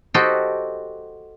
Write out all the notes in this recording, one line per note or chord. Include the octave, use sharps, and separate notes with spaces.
F#4 G4 A4 C5 D#5